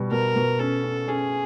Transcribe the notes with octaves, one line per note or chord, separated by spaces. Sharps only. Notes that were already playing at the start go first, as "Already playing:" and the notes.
Already playing: B2 G3
B2 A#4
B2
C#4 A4
C#4
C#4 G#4